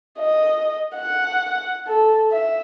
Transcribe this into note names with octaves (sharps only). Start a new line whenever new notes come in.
D#5
F#5
A4
E5